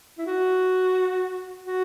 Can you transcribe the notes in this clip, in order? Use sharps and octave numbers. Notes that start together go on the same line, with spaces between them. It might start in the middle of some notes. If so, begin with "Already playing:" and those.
E4
F#4
F#4